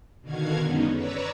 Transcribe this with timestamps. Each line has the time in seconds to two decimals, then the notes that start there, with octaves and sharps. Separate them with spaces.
0.21 B2 D3 D#3 F#4 F5 G#6
0.61 F#2 D3 G#3 B3 C#4 D#4
0.93 B4 C#5 D5 A#5 E6